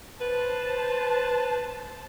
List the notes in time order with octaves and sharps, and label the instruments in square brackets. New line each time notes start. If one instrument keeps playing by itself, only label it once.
[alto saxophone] B4 [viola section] C5 A5